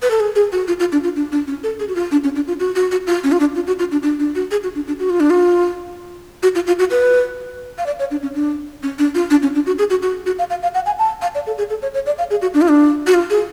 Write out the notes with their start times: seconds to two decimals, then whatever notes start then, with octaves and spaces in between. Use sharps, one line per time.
0.02 B4
0.11 A4
0.20 G#4
0.36 G#4
0.52 F#4
0.68 F4
0.80 F4
0.92 D4
1.04 F4
1.16 D4
1.32 D4
1.48 C#4
1.64 A4
1.80 G#4
1.88 F#4
1.95 F4
2.11 D4
2.24 C#4
2.36 D4
2.48 F4
2.60 F#4
2.75 F#4
2.92 F#4
3.07 F4
3.24 C#4
3.32 F4
3.40 D4
3.55 F4
3.67 F#4
3.79 F4
3.92 D4
4.03 D4
4.19 D4
4.35 F#4
4.51 G#4
4.63 F#4
4.75 D4
4.87 D4
4.99 F#4
5.10 F4
5.20 D4
5.30 F4
6.43 F#4
6.55 F4
6.67 F4
6.79 F#4
6.91 B4
7.78 F5
7.86 D5
7.99 C#5
8.11 D4
8.22 C#4
8.35 D4
8.83 C#4
8.99 D4
9.15 F4
9.30 D4
9.43 C#4
9.55 D4
9.66 F#4
9.79 G#4
9.90 F#4
10.02 F#4
10.26 F#4
10.39 F5
10.50 F5
10.63 F5
10.75 F#5
10.86 G#5
10.99 A5
11.22 F5
11.35 D5
11.47 A4
11.58 G#4
11.70 A4
11.82 C#5
11.94 C#5
12.06 D5
12.18 F5
12.30 G#4
12.42 F#4
12.54 D4
12.61 F4
12.68 D4
13.07 F#4
13.14 F4
13.30 G#4